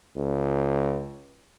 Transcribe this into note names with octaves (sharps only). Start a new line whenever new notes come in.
C#2